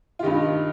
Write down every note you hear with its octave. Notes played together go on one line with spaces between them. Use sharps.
F4
G2 D#3 D#4 G4